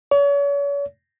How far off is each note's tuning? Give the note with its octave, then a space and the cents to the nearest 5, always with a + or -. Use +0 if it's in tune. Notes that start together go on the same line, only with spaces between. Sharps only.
C#5 +40